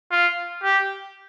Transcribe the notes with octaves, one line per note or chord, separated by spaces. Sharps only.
F4
G4